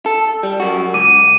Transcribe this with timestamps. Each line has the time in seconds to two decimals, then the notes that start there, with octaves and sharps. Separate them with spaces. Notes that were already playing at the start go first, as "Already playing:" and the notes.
0.06 A4
0.43 G3
0.60 F#2 F#4
0.94 C#2 D6 D#7